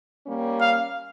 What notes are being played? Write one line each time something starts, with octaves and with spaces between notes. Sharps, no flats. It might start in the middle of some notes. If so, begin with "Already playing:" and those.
G3 A#3 C#4
F5